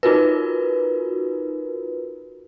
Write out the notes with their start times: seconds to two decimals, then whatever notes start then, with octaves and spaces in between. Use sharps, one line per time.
0.03 D#4 F4 F#4 A#4 B4